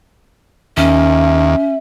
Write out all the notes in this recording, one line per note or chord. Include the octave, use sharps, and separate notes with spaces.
D#2 C#4 E5